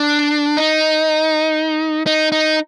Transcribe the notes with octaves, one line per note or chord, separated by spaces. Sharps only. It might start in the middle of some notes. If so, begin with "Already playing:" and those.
Already playing: D4
D#4
D#4
D#4